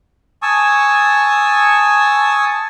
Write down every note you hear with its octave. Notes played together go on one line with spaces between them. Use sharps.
G#5 A5 C#6 D#6 E6